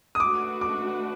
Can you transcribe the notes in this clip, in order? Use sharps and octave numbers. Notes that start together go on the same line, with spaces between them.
D#6
A3 D4 F#4 B4 D6
D6